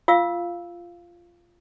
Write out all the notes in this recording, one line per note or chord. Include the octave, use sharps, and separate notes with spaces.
F4 F5 E6